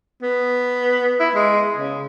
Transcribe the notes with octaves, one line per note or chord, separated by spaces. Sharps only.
B3
E4
G#3
C#3